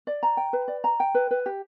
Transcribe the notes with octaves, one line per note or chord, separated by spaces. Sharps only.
D5
A#5
G5
B4
D5
A#5
G5
B4
B4
G4